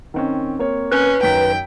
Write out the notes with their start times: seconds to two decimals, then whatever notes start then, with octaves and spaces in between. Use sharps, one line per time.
0.14 D#3 C4 C#4
0.59 A#3 C4 C#5
0.92 C#4 B4
1.23 F#2 D#3 G5 B6